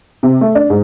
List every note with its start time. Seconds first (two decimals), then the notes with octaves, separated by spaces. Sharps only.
0.23 C3
0.41 A3
0.55 D4
0.70 G#2